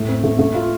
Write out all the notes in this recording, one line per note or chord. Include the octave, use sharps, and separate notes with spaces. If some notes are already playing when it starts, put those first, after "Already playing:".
Already playing: A2 A3
C4
A3
A3
F4